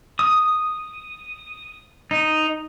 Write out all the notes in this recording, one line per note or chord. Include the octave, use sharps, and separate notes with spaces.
D#6
D#4